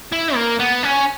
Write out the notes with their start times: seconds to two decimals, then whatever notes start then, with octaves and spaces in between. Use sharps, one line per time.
0.13 E4
0.35 A#3
0.60 B3
0.83 C#4